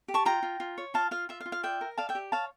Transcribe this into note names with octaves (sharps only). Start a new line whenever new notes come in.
G4
A5 C#6
F4 G5 A#5
F4
F4
C#5
F4 F5 A5
F4 F5
F4 E5
F5
F4
F5
D5 E5 G5
A#4
D5 F5 A5
E5 G5
G4
C#5 F5 A5